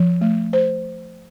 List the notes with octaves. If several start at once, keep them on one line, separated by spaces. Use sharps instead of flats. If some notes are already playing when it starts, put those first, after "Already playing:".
Already playing: F3
A3
C5